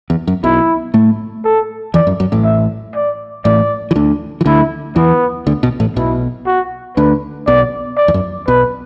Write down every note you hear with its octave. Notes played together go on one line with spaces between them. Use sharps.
E2
F#2
B1 B2 E4
A2 A3
A4
E2 E3 D5
F#2
F#2
A1 A2
E5
D5
A1 A2 D5
E3
D2 D3
E3
D2 D3 E4
E2 E3 B3
D2 D3
B1 B2
A1 A2
B1 B2 E4
F#4
D2 D3 B4
B1 B2 D5
D5
E2
F#2
B1 B2 B4